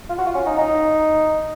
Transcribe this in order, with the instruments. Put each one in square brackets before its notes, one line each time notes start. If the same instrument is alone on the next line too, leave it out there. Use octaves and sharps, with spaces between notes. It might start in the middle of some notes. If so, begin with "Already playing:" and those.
[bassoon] F4
F#4
F4
C#4
D#4
D#4